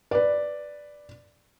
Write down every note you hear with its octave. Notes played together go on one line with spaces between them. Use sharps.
B4 D5